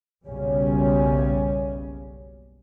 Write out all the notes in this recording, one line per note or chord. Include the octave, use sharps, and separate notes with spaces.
F#1 B1 F#2 C#3 G3 C#4